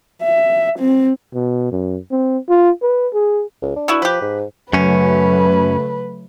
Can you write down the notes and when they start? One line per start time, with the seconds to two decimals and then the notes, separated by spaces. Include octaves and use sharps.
0.23 E5
0.79 C4
1.34 B2
1.72 F#2
2.12 C4
2.49 F4
2.82 B4
3.13 G#4
3.62 C#2
3.76 D4
3.88 B3 E4 F#4
4.02 F3 G4 B4
4.21 G#2
4.73 F#2 C#3 F#3 A3 C#4 B4